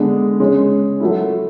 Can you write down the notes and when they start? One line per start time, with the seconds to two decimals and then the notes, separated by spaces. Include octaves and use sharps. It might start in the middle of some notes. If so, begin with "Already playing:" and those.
Already playing: D3 G#3 B3 D4
0.40 C#3 G#3 C#4
1.00 F#3 A3 E4